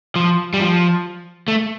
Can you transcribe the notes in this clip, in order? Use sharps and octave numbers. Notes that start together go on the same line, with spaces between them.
F3
G3
F3
A3